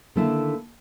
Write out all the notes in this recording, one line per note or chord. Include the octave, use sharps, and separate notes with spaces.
D3 D#3 A3 A#3 E4 A5